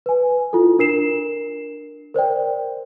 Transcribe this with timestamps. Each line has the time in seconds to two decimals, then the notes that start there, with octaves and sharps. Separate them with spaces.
0.06 B4 G#5
0.53 E4 F4 A4
0.79 D4 A#4 C7 E7
2.14 A#4 C5 D5 G5